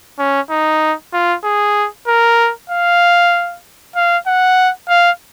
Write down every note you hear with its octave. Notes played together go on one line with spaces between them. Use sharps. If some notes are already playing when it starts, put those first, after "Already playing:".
C#4
D#4
F4
G#4
A#4
F5
F5
F#5
F5